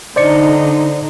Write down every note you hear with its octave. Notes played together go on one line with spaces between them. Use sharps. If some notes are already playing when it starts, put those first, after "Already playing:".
D3 D#4 C5 D5 C#7